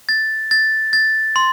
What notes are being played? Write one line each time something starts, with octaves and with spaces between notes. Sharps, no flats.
A6
A6
A6
C6